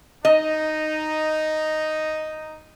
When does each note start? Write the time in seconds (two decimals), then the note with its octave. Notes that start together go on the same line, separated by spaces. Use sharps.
0.25 D#4 D#5